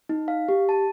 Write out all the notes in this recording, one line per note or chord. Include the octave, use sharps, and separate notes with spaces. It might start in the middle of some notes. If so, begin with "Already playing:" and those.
D#4
F5
G4
A5